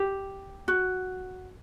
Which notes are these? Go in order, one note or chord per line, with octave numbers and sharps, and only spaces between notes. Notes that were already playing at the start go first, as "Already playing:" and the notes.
Already playing: G4
F#4